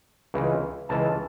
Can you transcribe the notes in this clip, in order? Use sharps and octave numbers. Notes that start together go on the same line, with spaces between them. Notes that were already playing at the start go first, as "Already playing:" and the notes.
C#2 C#3 E3 G#3
C#2 C#3 E3 G#3 A5